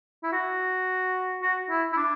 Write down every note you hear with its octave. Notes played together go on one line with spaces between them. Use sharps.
E4
F#4
F#4
E4
E4
D4